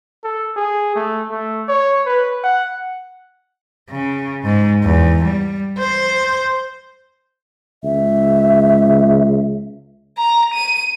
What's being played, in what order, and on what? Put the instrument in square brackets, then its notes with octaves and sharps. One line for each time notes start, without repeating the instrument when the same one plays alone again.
[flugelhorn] A4
G#4
A3
A3
C#5
B4
F#5
[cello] C#3
G#2
E2
G3
C5
[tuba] C#2 [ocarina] E5
[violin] A#5
D#7